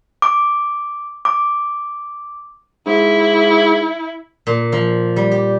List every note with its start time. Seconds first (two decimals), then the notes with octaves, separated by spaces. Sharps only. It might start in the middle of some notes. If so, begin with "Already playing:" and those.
0.22 D6
1.25 D6
2.86 G#2 E4
4.47 A#2
4.72 F3
5.16 G3
5.32 G4